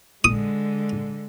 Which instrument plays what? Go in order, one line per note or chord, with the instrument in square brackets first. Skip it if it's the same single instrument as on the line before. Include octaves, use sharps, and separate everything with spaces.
[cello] D3 G#3 [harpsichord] D#6